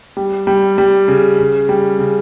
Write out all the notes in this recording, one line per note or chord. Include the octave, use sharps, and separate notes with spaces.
G3
G3
G3
C#3
C#3
G3
C#3